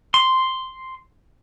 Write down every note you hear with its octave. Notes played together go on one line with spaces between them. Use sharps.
C6